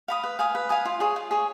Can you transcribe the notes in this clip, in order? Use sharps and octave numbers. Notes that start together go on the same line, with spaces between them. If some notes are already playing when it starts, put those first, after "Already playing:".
F5 B5 D#6
B4
F5 G#5 D#6
B4
F5 G#5 D#6
F4
G#4 C#5
F4
G#4 C#5